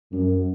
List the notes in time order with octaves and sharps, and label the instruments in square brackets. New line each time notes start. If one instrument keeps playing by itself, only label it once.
[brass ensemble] F#2